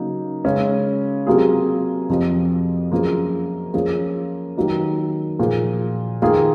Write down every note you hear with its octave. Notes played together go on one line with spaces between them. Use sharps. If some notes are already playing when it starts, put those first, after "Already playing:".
Already playing: C#3 F#3 A#3 D#4
C#3 G#3 C#4
C3 F#3 A#3 F4 G#4
F2 C3 F3
F#2 F3 A#3 F4 G#4
F3 A#3 C#4 F4 G#4
D#3 F#3 A#3 D#4
A#2 F3 A#3 F4 G#4
D#3 A#3 F4 G#4